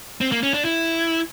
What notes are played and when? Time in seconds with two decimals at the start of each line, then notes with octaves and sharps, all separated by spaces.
0.21 C4
0.32 A#3
0.43 C#4
0.54 D4
0.65 E4